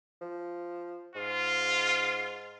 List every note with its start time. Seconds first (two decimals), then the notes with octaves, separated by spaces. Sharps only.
0.21 F3
1.15 G#2 F4